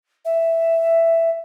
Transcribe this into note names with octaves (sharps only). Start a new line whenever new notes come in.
E5